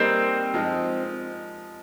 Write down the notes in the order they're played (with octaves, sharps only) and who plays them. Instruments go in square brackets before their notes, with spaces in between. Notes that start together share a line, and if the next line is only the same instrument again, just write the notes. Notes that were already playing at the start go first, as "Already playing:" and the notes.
Already playing: [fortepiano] G3 A#3 D#4 A#4 [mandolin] C4
[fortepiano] F3 G#3 D#4